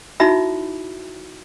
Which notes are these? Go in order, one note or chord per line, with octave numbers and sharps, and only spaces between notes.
D#4 E4 F#4 E5 B5